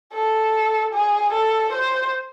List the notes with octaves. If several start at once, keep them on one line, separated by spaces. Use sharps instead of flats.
A4
G#4
A4
C5